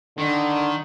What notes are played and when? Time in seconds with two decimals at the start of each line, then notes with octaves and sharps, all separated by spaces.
0.18 D3 D#3